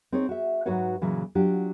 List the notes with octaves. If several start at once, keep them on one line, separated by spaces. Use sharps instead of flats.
C4 D#4 G#4 C#5
F#4 E5
G#2 F#3 F#4 B4 C#5 F#5
A#2 C#3 E3 F#3
F#3 D4 F4 G4